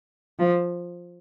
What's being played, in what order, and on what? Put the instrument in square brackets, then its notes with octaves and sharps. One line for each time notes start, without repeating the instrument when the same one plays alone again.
[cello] F3